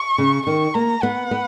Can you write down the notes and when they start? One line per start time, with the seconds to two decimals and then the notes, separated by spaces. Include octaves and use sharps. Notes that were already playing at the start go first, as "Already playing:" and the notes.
Already playing: C#6
0.18 C#3
0.46 D#3 C#6
0.74 A#3 A#5
1.02 B3 F#5
1.31 B3